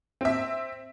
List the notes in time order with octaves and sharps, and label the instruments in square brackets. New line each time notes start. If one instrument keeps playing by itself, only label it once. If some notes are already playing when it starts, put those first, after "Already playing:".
[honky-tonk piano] C4 E5